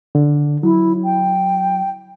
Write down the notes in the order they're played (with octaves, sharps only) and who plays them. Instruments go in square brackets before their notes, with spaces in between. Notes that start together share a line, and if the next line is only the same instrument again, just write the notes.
[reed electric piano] D3
[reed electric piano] F#3 [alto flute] E4
[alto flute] G5